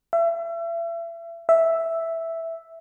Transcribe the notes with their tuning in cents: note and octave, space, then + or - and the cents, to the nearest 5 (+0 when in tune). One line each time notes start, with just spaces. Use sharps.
E5 +35
E5 +0